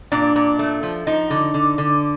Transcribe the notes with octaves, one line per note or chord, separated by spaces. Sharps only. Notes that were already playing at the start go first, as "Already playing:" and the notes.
A#2 D4
A#2
A3
F3
F3 D#4
D3
D3
D3